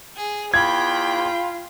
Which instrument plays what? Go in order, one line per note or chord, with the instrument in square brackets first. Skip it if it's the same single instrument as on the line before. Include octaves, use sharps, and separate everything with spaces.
[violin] G#4
[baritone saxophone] E2 [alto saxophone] F4 [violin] G5 B5 [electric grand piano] G#6